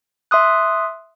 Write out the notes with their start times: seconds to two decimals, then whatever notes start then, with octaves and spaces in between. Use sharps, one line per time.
0.31 E5 C6 D#6 F#6